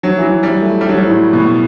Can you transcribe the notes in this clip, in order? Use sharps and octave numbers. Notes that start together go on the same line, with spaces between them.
F#3
E3
F#3
G3
A3
G3
F#3
G3
A2
B2